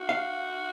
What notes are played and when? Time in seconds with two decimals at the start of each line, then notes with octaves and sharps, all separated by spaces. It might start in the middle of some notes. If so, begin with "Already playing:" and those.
Already playing: F#4
0.09 F5